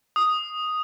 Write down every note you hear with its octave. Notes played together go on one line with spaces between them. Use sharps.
D#6